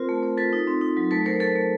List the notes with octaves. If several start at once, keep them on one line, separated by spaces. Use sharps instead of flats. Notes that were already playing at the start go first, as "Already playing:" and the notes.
Already playing: C4 F4 A#4 C5
A3
A3
F4 A4 B4
D#4
C4
D#4
F#3
A3 A4 B4
A3 A#4 C5
A3 A4 B4
A3